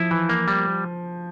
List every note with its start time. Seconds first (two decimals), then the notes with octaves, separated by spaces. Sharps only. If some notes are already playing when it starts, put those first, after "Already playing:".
Already playing: F3 E4
0.11 E3
0.29 A#3
0.48 G3